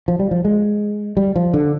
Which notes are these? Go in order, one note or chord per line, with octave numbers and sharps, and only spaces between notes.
F3
G3
F3
G#3
G3
F3
D3